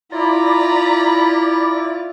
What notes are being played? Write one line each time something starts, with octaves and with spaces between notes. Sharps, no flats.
E4 F4 D5 A#5 B5